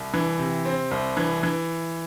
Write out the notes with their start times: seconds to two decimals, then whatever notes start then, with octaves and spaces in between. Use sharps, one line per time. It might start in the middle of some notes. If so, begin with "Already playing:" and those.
Already playing: C2
0.14 E3
0.39 C3
0.65 C4
0.91 C2
1.17 E3
1.43 E3